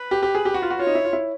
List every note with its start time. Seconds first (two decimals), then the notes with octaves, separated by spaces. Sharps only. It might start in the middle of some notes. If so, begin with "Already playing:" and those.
Already playing: B4
0.11 G4
0.23 G4
0.35 G#4
0.45 G4
0.54 F#4
0.62 F4
0.70 F#4
0.79 F4 C#5
0.87 D#4
0.95 E4
1.05 F4
1.13 E4